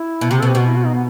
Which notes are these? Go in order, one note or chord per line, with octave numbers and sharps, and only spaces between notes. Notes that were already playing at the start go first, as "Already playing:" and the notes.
Already playing: E4
B2
C3 G4
B2 A4
G4
B2 F#4
E4
F#4
D#4
B3